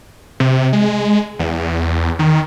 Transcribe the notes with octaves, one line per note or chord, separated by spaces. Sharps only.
C3
G#3
E2
D#3